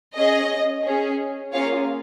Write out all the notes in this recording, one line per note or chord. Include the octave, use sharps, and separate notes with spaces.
C#4 G#4 D#5
C#4 G#4
A#3 C#4 F4 G#4 C#5 F5